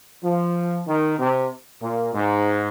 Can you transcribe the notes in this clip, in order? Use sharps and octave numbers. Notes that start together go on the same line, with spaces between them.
F3
D#3
C3
A#2
G#2